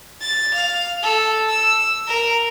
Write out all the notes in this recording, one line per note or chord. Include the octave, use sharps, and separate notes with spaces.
A6
F5
A4
E6
A#4